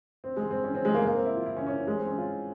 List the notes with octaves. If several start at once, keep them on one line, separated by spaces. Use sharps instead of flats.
C4
G#3
C4
C#4
C4
G#3
A#3
A#3
C4
E4
F4
E4
C#4
C#4
G#3
C4
C#4
F4